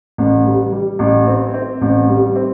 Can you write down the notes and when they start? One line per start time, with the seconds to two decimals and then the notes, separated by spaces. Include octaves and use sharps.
0.18 A1
0.45 G3
0.72 G3
0.99 A1
1.27 C4
1.54 C4
1.81 A1
2.09 G3
2.36 C4